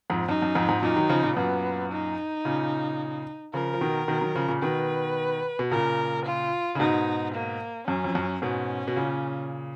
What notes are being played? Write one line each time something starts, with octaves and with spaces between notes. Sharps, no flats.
F2 G#2
F#2 D#4
F#2
F2 G#2
F2 G#2
F#2 A#2 D#4
D#3 F#3
C#3 F3
A#2 C#3
F#2 A#2 B3
D#4
A#2 C#3
C#3 F3 A#4
F3
B2 D#3
B2 D#3
D#3 F#3
C#3 F3
A#2 C#3
B2 D#3 B4
B2
A#2 C#3 A#4
F4
C#3
G#2 B2 D#4
A#3
F#2 C#4
F2
F#2
G#2 B2 C#4
B2
A#2 C#3